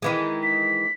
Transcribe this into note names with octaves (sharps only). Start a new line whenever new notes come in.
D#3 E3 G#3
B6